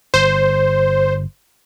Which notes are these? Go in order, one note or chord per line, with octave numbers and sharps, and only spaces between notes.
G1 C5